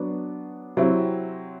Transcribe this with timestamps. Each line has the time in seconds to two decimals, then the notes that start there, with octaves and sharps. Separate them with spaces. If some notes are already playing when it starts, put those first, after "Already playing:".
Already playing: F#3 B3 D4
0.77 C3 F#3 C4 E4